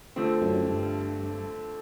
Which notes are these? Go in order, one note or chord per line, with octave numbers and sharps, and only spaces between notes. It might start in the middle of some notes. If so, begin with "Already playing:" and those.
D3 F3 A3 C4
F#2
G2